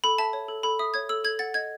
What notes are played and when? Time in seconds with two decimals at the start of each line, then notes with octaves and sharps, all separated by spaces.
0.04 A4 B5
0.18 E5 A5
0.33 C#5
0.48 A4
0.63 A4 B5
0.79 E5 D#6
0.94 C#5 G#6
1.09 A4 E6
1.24 A4 G#6
1.39 F#5 A6
1.54 D#5 G#6